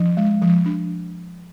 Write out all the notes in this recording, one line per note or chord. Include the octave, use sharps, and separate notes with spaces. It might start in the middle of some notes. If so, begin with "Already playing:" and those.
Already playing: F3 D4
G#3
F3
D4